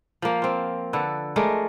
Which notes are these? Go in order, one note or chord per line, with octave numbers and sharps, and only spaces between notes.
F3 A#3
C4 F4
D3 A4 B4
G#3 A3 A#4 D5